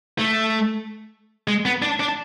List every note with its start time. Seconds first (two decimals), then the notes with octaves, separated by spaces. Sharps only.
0.18 A3
1.48 G#3
1.65 B3
1.82 D4
2.00 D4